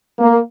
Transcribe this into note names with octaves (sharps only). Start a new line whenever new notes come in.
A#3